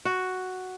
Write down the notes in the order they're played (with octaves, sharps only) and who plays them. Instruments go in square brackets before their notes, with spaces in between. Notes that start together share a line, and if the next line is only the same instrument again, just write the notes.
[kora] F#4